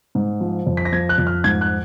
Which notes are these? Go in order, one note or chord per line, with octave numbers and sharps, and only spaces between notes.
G#2
F3
F2
B6
A#6
F3 G#6
F#6
F2
F6
G#2 G#6
F#6